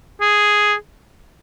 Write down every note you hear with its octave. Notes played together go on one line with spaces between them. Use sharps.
G#4